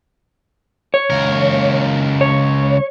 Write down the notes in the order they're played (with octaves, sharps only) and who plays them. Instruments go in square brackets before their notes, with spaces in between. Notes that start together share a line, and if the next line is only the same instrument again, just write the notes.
[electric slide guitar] C#5
[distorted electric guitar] C#2 A#4
[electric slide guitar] C#5